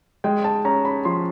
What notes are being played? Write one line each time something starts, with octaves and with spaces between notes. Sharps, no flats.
G#3 G5
A5
C#4 A#5
B5
F3 C6